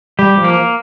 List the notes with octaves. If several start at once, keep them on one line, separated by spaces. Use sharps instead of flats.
G3 G4
F3
A#3